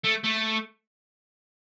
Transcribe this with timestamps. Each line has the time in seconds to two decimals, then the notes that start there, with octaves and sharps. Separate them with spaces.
0.05 A3
0.24 A3